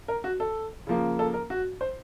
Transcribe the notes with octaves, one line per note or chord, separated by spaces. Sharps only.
A#4
F#4
A4
C#3 F3 A#3
A4
A#4
F#4
C5